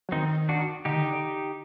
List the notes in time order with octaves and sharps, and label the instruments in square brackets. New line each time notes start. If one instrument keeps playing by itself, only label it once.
[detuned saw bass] F#3
[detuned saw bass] D#3 [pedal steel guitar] C4 D#4
[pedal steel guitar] D4 F#4
[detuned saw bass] D3 [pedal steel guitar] D#4 G4
[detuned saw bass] D#3
D3